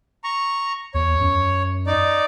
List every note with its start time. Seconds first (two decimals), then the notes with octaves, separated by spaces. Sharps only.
0.24 A#5 C#6
0.94 E2 C#5
1.20 F#2
1.87 D#4 D5